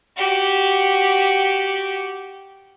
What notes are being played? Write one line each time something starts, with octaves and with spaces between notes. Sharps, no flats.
F#4 G4